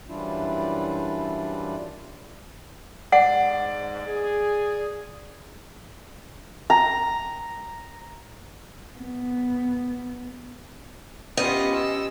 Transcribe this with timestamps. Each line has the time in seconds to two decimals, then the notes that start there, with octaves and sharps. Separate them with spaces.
0.08 F#2 E3 G3 D4 E4 F4
3.12 G#2 D5 F#5
4.06 G#4
6.70 A#5
8.99 B3
11.37 B3 C#4 F4 G4 D#5
11.75 E6